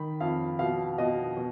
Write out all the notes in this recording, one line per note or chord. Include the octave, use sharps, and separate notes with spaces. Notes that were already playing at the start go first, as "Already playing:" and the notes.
Already playing: D#3 B5
F2 F5
B2 F5
B2 D#5
B2